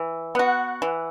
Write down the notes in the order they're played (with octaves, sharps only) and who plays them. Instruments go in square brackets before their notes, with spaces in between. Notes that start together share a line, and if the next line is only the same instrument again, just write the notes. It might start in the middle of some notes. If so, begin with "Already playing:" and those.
Already playing: [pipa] E3
[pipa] B3 F#4 [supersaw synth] F#5
[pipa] E3